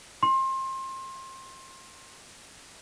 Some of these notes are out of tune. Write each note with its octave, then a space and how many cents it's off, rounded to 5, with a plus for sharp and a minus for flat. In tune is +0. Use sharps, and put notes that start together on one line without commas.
C6 +30